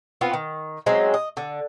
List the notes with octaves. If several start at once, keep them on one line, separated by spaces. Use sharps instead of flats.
B3 C4 F4
D#3
F#3 G#3 C4 C#4
D#5
D3